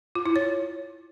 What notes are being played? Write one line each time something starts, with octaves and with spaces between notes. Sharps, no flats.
F4
E4
C#5